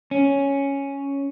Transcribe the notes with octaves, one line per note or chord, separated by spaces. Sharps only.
C#4